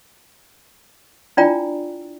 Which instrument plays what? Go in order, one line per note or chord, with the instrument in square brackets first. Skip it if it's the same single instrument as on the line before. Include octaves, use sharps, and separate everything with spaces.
[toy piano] D4 E4 F4 D5 G5 A#5